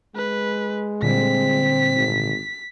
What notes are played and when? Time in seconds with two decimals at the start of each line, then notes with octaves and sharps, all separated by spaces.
0.16 G#3 B4
1.02 A#2 D3 G3 C4 B6
1.96 G#1